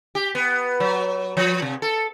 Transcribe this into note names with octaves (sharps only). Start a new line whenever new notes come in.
G4
B3
F#3
F3
C3
A4